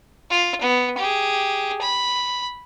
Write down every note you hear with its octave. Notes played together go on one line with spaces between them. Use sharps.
F4
B3
G4 G#4
B5